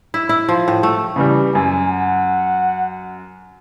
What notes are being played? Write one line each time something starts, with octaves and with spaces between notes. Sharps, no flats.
E4
E4
F3
A2
A3
C#3 E3 G3
F#2 G#5
F#5